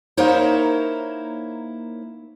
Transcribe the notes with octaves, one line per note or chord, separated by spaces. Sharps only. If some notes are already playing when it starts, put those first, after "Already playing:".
A#3 D#4 E4 A#4 C5 C#5